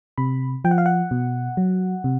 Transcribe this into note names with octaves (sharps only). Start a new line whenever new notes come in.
C3 B5
F3 G5
F#5
F5
F#5
B2
F#3
C3